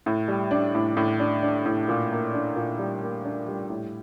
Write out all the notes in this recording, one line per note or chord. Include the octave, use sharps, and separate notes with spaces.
A2
G3
D4
A2
A2
D4
D4
A2
A#2
A#3
D4
A#2
G3
A#3
D4
G3
A2